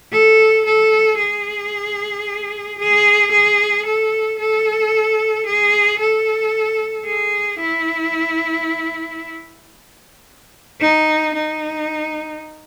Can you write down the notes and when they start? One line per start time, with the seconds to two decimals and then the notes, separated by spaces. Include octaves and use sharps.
0.12 A4
0.65 A4
1.18 G#4
2.78 G#4
3.32 G#4
3.86 A4
4.39 A4
5.46 G#4
5.99 A4
7.06 G#4
7.60 E4
10.80 D#4
11.34 D#4